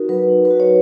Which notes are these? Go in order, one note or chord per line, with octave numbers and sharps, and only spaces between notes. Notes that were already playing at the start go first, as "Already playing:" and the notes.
Already playing: D#4 F#4 A#4
F#3 B4
D#4
B4
F#4
C#5